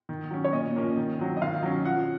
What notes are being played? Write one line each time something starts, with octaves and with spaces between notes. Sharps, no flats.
D#3
F#3 C#4
C#5
A#2 D#5
F3 A#3 C#4
D#3
F#3 C4
D#5
D#3 F5
F#3 C#4
F3 F#5